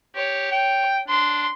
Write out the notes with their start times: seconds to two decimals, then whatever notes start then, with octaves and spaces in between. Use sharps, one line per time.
0.16 G4 C#5
0.52 G5
1.08 D4 C6